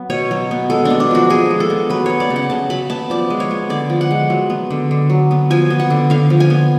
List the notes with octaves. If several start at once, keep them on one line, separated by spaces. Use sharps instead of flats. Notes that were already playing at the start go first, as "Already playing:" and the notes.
Already playing: F#3 B3
B2 C#5
F#3
B3
G#3 A4
D4
B3
D4
F3 F#4
F3 G#4
G#3
A4
B3
F#3 B4
B3 C#5
D5
C#3
F#5
C#3 A5
F#3 B5
B3 A5
F3 D5
G#3
C#5
B3
D3 D5
F3
F#5
G#3
F#3
B3
D3
D3
F#3
B3
F3 G#5
B3
F#5
D3
D3 F5
F3
G#5
B3